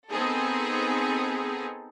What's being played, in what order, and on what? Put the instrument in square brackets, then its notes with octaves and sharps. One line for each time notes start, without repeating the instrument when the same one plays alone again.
[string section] B3 C4 D#4 G#4 A4